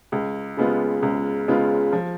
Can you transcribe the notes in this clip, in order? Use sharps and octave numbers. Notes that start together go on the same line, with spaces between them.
C#2
C#3 G#3 B3 F4
C#2
C#3 G#3 B3 F4
F3